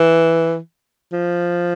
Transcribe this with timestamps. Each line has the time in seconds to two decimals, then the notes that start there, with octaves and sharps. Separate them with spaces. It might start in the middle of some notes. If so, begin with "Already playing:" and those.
Already playing: E3
1.13 F3